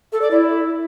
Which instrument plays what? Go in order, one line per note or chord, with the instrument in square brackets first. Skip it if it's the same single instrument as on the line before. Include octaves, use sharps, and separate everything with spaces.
[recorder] A4
D5
E4